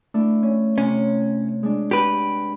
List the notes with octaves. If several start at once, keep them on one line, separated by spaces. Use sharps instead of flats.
A3 D4 E4
C#4
C3 C#4
G#3 D4
G4 B4